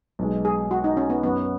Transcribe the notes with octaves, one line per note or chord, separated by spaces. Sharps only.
B1 B2 G#3
G#4
F#4
D#4
C#4
B3
F#2 F#3 B3 C#4 F#4